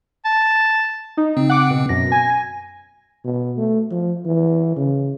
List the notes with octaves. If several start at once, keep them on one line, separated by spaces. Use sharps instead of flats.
A5
D#4
C#3 C4
F#5 D6
B2
F#2 B2 A#6
G#5
B2
A3
F3
E3
C#3